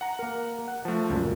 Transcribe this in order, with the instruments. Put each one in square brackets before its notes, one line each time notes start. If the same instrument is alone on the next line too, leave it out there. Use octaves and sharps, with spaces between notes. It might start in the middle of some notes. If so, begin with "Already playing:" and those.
[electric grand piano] F#5 A#5
[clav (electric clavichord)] A#3 A#4
F#5
[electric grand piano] F3 A3 [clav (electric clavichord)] A5
[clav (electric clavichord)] C#2 F#2 [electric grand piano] A#2